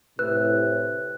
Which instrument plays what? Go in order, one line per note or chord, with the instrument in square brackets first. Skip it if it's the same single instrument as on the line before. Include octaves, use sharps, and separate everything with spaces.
[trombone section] A2 C3 [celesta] B4 [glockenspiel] F#6